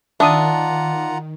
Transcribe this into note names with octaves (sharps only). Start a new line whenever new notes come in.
D#3 D4 F4 E5 F#5 A5 A#5 D#6